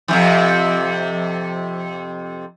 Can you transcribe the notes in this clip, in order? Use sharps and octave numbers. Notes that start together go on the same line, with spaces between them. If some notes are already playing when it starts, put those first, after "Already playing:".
F2 C3 E3